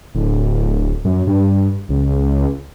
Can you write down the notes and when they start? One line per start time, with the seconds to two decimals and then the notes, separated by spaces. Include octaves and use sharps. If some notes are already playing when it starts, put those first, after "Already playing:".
0.15 D1
1.05 F#2
1.27 G2
1.89 C#2